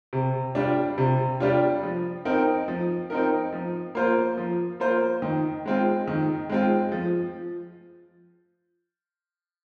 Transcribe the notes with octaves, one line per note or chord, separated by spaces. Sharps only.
C3
G3 D4 F4
C3
G3 D4 F4
F3
C4 D#4 A#4
F3
C4 D#4 A#4
F3
A#3 F4 C5
F3
A#3 F4 C5
D#3
G#3 C4 F4
D#3
G#3 C4 F4
F3